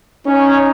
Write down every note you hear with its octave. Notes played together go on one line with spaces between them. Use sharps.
C#4 D#4